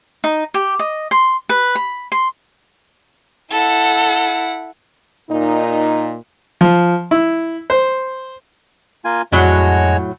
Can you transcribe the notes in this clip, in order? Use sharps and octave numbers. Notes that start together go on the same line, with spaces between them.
D#4
G4
D#5
C6
B4
B5
C6
E4 A4 F#5
A#2 D#4
F3
E4
C5
A#3 F4 G#5
F2 A2 F#3 G#3 F#4 C#5